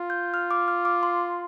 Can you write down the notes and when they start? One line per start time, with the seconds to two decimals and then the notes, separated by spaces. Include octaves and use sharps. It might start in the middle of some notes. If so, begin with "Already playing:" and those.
Already playing: F4
0.10 G6
0.34 F6
0.51 D6
0.68 F6
0.85 D6
1.03 C6